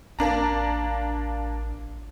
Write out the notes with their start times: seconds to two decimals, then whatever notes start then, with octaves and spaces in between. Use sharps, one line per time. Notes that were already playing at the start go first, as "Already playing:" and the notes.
0.19 A1 A#3 D4 A#5